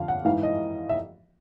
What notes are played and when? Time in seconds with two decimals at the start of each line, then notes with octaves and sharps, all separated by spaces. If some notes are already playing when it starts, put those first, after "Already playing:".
Already playing: F2 D3 F3 F5
0.08 F#5
0.25 G#2 E3 F5
0.43 D#5
0.89 E5